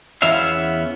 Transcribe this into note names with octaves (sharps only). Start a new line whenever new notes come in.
E2 E3 B3 C#4 E5 F5